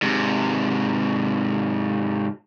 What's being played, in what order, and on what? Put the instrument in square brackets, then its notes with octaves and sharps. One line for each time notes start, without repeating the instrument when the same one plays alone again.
[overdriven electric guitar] G#2 C3